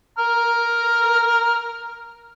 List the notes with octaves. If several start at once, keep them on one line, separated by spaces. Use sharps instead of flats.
A#5 F6